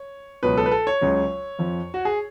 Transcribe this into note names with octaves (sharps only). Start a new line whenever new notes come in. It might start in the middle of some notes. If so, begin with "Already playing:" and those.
Already playing: C#5
C#2 B2 F#3 B4
A4
B4
A4
C#5
C#2 C#3 F#3
F2 F3
F#4
G#4